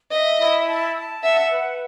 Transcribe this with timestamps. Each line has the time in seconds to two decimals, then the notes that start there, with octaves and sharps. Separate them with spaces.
0.11 D#5 E5
0.39 E4
0.67 A5
0.95 A5
1.23 E5 F#5
1.51 B4